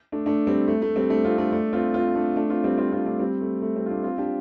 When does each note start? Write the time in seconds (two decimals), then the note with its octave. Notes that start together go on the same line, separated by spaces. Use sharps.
0.12 A3 D4
0.26 A3 D4
0.47 G3 C4
0.68 A3
0.82 A3
0.96 G3 C4
1.10 A3 D4
1.25 C4 F4
1.38 A3 D4
1.52 A3 D4
1.73 C4 F4
1.94 C4 F4
2.15 A3 D4
2.36 A3 D4
2.49 C4 F4
2.64 G3 C4
2.78 C4 F4
2.92 C4 F4
3.06 A3 D4
3.19 G3 C4
3.41 A3
3.62 A3
3.76 G3 C4
3.86 F4
3.90 A3 D4
4.03 C4 F4
4.18 D4 G4